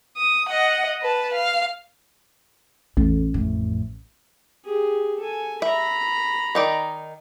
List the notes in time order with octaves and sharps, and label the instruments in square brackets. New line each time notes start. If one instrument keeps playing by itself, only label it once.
[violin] D#6
D#5 F#5
B4 A5
F5
[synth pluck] A1 [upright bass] E2
[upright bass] F2 A2
[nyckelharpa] G4 G#4
A4 G#5
[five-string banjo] E5 [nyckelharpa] A#5 B5
[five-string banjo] D#3 D#4 D5